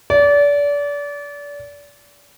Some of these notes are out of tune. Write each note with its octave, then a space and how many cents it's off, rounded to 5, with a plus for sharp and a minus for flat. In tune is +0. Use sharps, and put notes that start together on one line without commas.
D5 -30